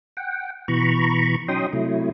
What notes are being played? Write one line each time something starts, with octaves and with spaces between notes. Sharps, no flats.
F#5 G5
B2 E3 A#5 B5 C#6
F#3 C#4 D#4 G5 C6 D#6
C3 F#3 A3 E4